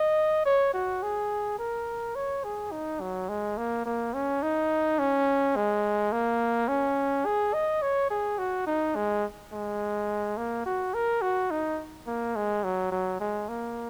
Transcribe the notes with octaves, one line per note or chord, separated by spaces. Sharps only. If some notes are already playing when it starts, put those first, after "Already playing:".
Already playing: D#5
C#5
F#4
G#4
A#4
C#5
G#4
D#4
F#3
G#3
A#3
A#3
C#4
D#4
C#4
G#3
A#3
C#4
G#4
D#5
C#5
G#4
F#4
D#4
G#3
G#3
A#3
F#4
A#4
F#4
D#4
A#3
G#3
F#3
F#3
G#3
A#3